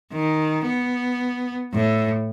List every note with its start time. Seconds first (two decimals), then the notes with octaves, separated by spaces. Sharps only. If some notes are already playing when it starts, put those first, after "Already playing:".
0.13 D#3
0.66 B3
1.74 A2